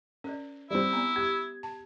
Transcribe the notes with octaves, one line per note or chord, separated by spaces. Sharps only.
C#4 A#4 C5 D5
G3 C4 E4
B3 F#5 A#5
G4 C5 D#6 G#6
A5